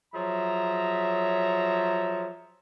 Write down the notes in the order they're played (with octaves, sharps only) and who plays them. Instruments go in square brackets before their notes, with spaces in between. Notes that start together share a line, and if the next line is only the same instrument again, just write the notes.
[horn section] F3 F#3 G#4 C#5 E5 A#5